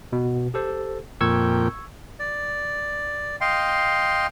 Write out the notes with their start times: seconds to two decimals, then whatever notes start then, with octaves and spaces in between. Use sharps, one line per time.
0.12 B2
0.54 G4 A4 C5
1.21 F2 A#2 G5 C#6 E6 G#6
2.20 D5
3.41 D#5 F5 G5 C6